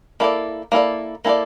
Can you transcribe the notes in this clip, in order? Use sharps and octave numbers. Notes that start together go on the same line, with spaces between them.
A#3 E4 A4 D5
A#3 E4 A4 D5
A#3 E4 A4 D5